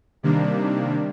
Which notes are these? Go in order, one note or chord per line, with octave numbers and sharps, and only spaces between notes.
C3 D#3 G3 A#3 D4